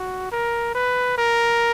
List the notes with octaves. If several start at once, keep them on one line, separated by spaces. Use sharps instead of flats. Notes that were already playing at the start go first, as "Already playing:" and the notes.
Already playing: F#4
A#4
B4
A#4